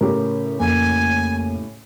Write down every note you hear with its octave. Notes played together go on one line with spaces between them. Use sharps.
A2 C#3 G4 A#4
F2 A#3 G#5